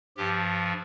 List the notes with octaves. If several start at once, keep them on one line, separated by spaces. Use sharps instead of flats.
G2 F3 G4